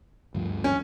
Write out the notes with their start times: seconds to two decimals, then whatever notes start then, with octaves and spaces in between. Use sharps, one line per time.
0.35 D2 G2 F3
0.64 C#4